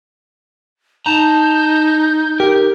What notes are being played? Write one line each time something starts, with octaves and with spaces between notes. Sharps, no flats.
D#4 A5 A#5 G6
G4 A#4